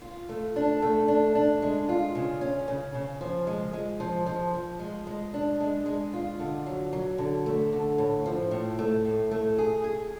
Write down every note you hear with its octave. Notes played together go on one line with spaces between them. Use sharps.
F4
A3
D4
A3
D4
D4
G#3
F4
C#3
C#4
C#3
C#3
F3
G#3
G#3
F3
F3
F3
G#3
G#3
D4
G#3
G#3
F4
D3
F#3
F#3
D3
A3
D3
A2
F3
A2
A3
A2
A3
G#4
G#4